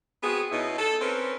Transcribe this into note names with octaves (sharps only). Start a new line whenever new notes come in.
B3 C4 F#4 G#4
B2 C#4 D#4 E4
A4
C4 C#4 A#4 B4